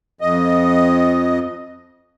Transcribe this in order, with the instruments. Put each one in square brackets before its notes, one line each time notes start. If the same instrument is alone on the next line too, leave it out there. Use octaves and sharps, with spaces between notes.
[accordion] F2 D#5